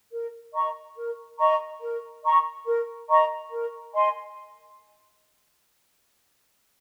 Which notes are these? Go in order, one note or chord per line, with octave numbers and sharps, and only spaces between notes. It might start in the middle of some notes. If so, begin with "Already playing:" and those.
A#4
D#5 A#5 C#6
A#4
D#5 A#5 C#6
A#4
D#5 A#5 C#6
A#4
D#5 A#5 C#6
A#4
D#5 G#5 C6